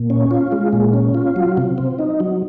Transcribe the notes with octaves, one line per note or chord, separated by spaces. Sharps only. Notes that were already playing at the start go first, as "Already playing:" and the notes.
Already playing: A#2
C#4
F4
G#3
A#2
C#4
F4
F#3
C3
C4
D#4
F#3